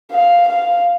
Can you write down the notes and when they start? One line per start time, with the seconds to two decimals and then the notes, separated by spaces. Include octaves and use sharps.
0.12 F5
0.49 F5